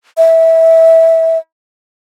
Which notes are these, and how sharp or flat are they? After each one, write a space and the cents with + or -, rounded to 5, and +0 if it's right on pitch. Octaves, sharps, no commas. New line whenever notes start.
E5 -15